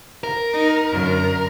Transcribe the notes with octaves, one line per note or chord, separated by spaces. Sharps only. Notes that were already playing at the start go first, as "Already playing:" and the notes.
A#4
D#4
F#2 D3